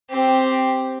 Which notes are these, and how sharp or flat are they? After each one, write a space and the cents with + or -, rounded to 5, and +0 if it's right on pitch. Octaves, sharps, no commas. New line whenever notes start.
C4 +0 G4 +0